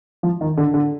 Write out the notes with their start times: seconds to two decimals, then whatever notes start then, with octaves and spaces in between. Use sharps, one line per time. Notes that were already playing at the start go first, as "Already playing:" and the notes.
0.23 F3
0.41 D#3
0.57 D3
0.74 D3